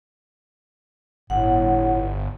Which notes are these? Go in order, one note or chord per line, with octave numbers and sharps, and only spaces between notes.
G1 A2 F#5